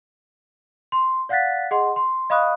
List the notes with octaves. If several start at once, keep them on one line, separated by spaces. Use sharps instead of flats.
C6
D5 F5 F#5 F#6 A6 B6
G#4 D#5 F#5 C6
C6
D#5 F5 B5 C#6 D#6 F#6